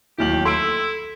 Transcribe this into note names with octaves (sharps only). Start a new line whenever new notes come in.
D1 D#2 E4 G4 G5 F#7
E4 A4 C6 E6 D7